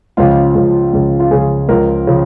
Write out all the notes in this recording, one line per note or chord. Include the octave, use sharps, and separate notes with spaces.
C#2 C#3 F3 F4
C#2 C#3 F3
C#2 C#3 F3
F4
C#2 C#3 F3 G#4
C#2 C#3 F3 A#4
C#3 F3